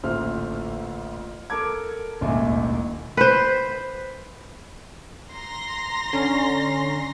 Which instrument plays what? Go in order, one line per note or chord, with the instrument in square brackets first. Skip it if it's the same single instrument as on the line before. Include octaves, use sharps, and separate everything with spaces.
[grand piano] A1 D2 A#2 A3 C5 F6
A4 A#4 A5 D6 G#6
E1 A1 D#2 E5 G#5
[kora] B4 C5
[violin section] A#5 C6 A#6
[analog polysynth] D3 C#4